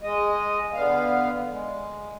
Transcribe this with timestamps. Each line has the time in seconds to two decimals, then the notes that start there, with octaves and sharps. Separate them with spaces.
0.01 G#3 D#5
0.73 D3 B3 F5
1.48 G#3